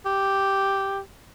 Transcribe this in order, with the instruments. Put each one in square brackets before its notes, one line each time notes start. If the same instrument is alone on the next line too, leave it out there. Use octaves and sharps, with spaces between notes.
[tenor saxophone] G4